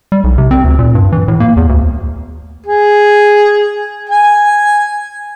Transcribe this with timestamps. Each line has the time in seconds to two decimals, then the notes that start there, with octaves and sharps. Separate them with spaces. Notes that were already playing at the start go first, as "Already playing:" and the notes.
0.12 G3
0.24 B1
0.38 C3
0.51 C4
0.64 D2
0.79 A#2
0.95 G2
1.12 E3
1.28 A2
1.40 A#3
1.56 E2
1.69 D2
2.67 G#4
4.10 G#5